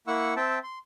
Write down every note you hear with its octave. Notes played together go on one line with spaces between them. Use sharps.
A#3 E4 F#5 C#6 E6
C4 E5 G5 A5
C6